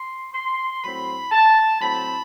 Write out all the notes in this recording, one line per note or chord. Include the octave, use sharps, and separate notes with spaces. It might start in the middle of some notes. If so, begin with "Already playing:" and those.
Already playing: C6
C6
A2 F#3 C4 B5
A5
A2 F#3 C4 B5